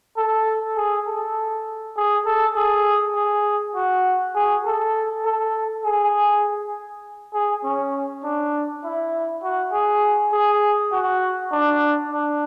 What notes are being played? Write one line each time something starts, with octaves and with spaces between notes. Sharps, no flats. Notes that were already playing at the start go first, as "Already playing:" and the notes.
A4
G#4
A4
G#4
A4
G#4
G#4
F#4
G#4
A4
A4
G#4
G#4
C#4
D4
E4
F#4
G#4
G#4
F#4
D4
D4